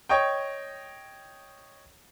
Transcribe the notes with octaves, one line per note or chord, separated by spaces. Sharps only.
C#5 D#5 G5